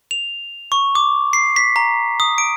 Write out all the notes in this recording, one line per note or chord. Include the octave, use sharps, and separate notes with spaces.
F7
C#6
D6
C7
B6
A#5
D#6
D7